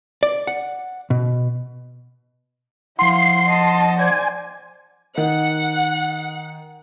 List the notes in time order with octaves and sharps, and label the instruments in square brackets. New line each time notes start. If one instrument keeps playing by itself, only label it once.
[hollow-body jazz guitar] D5
F#5
B2
[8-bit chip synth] F3 F#5 [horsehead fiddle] E4 F5 [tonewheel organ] C6
[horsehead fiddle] D#5 A5
[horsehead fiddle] C5 D5 [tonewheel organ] G#5
[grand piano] D#3 [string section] F#5